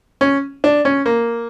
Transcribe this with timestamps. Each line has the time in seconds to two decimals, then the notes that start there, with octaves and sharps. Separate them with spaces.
0.21 C#4
0.64 D4
0.85 C#4
1.06 A#3